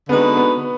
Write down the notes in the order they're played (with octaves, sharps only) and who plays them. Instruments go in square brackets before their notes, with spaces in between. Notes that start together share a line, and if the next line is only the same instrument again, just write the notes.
[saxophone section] D3 G#3 D#4 F#4 B4 [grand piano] B3
[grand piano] B3